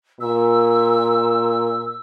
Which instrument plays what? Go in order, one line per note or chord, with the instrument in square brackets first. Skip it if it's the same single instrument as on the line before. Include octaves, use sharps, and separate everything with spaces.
[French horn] A#2 [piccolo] E6